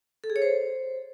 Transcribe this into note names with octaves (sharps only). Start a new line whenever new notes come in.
A4
G#4
C#5
C5